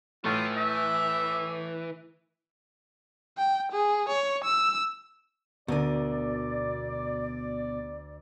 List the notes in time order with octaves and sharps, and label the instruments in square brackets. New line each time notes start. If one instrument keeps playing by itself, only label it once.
[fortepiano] A2 A3 [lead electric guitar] E3 [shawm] F4
[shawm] E5
[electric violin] G5
G#4
C#5
E6
[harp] D2 A#4 D#7 [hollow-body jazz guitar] B2 D4 [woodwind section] D5